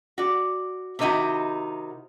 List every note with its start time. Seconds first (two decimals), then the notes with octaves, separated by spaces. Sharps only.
0.18 F#4 D5
0.99 C3 D#3 C#4 D#4 E4 F#4